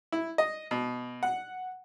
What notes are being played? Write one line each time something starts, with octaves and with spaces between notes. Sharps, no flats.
E4
D#5
B2
F#5